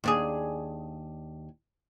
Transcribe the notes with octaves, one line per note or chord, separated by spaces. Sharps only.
D#2 D4 G#4